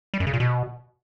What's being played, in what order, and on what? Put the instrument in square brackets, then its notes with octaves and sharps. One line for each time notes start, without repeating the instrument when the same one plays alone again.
[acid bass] G3
F#2
C#3
A#2
B2